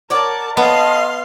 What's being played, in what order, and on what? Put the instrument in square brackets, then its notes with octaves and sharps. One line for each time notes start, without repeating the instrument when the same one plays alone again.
[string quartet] A#4 A5 [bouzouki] C#5 D5 F#5
[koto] B3 [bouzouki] A4 C#5 A5 [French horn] D#5 [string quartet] F5 C6 F6